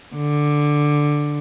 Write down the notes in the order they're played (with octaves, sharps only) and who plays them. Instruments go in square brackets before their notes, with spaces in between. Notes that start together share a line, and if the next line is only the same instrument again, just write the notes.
[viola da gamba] D3